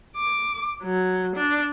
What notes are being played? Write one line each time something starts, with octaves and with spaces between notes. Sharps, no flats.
D6
F#3
D4